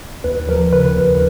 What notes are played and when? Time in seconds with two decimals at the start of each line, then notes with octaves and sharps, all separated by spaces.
0.24 D#2 B4
0.49 F3 A#4
0.72 C#3 B4
0.96 D#2